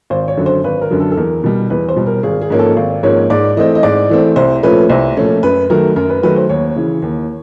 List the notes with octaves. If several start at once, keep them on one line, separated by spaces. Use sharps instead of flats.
G#1 C5
C#5
F#2 D3 F#3
C5
G#1 B4
A#4
F#2 D3 F#3
A4
A4
E2 A#4
B2 G3
E2 B4
C5
B2 G3
A#4
G#1 G#4
G#4
G#2 F3 A#3 C#4
A4
G#1
G#2 F3 A#3 C#4 C#5
G#2 D5
E3 A3 C4 D#5
D#5
G#2 D5
E3 A3 C4
C2 C5
A#2 F3 A3 C#4 B4
C2 C5
A#2 F3 A3 C#4
F#2 B4
D#3 F#3 A3 A#4
F#2 A#4
B4
D#3 F#3 A3 B4
C5
D#2 C#5
C#3 E3
D#2